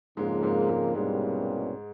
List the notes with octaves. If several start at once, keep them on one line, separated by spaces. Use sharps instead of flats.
F2 G#2 C#3 F3 G#3 A#3
G#2 G#3
G#2 G#3
C2 G#2 B2 G3 G#3 A#3 C#4